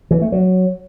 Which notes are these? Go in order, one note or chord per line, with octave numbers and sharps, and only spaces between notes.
E3
A3
F#3